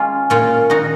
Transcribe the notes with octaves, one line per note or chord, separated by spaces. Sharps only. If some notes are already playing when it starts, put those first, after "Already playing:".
Already playing: G#3 C#4 F4
A#2 C#4 F4
D#3 D#4 F#4